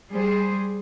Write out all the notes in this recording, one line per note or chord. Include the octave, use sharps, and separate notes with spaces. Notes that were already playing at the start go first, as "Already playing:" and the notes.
G3 G#4 C5